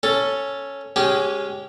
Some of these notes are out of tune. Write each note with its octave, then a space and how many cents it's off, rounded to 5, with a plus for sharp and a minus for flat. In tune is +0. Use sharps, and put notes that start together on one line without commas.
C#4 +0 A4 +5
G#3 -10 C#4 +0 G4 -25